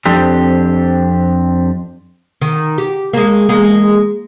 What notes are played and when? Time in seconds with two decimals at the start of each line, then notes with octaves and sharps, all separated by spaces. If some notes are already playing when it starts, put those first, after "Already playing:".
0.06 F2 C4 D4 G4
2.41 D#3
2.78 G4
3.13 G#3 A#3
3.49 E2 G#3 A#3